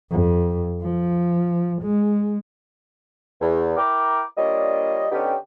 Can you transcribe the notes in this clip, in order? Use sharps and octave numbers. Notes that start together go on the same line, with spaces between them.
F2
F3
G#3
E2
E4 A#4 G5 A#5 D6
G3 A#3 D4 F4 C#5 D#5
D3 B3 C#4 D#4 G4